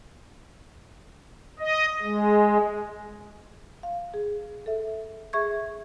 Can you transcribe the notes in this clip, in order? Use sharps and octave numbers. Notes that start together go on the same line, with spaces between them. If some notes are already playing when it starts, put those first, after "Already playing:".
D#5
G#3
F5
G#4
A4 E5
G#4 E5 C#6 G#6